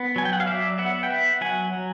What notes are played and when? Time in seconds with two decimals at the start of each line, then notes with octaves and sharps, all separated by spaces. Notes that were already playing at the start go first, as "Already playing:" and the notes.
Already playing: B3
0.16 F#3 G#5
0.25 G5
0.33 F#5
0.40 F5
0.47 F#3 D5 E5
0.78 B3 E5 F#5
1.03 G5
1.10 B3 E5 F#5
1.41 F#3 F#5 G#5
1.73 F#3